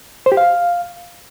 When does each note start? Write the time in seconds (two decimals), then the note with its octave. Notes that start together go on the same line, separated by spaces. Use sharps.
0.26 C5
0.32 G4
0.37 F5